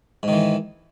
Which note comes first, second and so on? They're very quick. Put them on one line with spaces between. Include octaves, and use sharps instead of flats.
G#2 D#3 E3